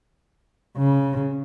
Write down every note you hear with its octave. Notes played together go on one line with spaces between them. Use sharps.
C#3